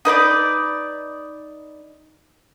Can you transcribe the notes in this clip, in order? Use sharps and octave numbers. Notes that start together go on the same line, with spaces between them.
D#4 B4 C5 D5